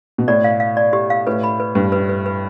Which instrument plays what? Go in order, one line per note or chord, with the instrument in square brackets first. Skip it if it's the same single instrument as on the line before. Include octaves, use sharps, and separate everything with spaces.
[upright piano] B2
[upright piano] A2 [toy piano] D5
[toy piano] F5
F5
D5
G4
F5
[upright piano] A2 [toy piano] B4
[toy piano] B5
B4
[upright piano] G2 [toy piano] B4
[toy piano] B4
B4
B4